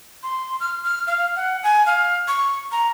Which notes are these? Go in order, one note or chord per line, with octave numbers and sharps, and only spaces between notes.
C6
F6
F6
F5
F#5
G#5
F5
C#6
A#5